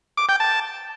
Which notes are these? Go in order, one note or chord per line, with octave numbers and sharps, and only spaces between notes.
D6
G5
A5